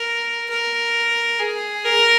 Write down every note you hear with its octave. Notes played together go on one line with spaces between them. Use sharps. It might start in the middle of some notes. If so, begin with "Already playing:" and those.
Already playing: A#4
A#4
G#4
A#4